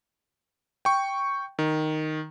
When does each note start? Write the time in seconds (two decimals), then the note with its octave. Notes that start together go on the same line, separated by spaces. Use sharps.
0.85 G5 C#6
1.59 D#3